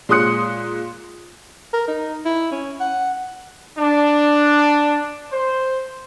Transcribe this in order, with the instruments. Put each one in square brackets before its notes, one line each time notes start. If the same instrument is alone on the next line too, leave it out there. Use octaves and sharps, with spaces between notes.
[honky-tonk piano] A#2 G#3 C6 D#6 F#6 C#7
[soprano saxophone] A#4
D#4
E4
C#4
F#5
[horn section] D4
C5